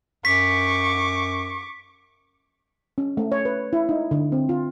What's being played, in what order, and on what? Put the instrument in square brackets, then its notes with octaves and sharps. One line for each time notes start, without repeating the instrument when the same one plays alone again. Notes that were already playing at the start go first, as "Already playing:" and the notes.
[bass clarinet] F#2 [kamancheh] C#6 D6 [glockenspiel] B6
[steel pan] C#4
A3
C#5
B4
E4
D#4
D3
C4
F4